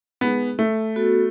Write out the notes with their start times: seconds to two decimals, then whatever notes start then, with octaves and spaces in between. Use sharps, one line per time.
0.21 G#3 B3 D#4 G#4
0.59 A3
0.96 B3 F#4 A4